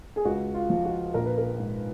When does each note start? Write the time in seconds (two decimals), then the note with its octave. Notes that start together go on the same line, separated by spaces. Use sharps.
0.16 G#4
0.25 C#2 F#4
0.54 F4
0.70 F3
0.85 F#4
1.14 A#1 A#4
1.26 B4
1.38 A#4
1.59 G#2